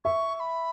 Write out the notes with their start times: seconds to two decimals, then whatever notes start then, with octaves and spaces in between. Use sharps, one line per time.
0.05 E5 C#6
0.35 C#6
0.40 B5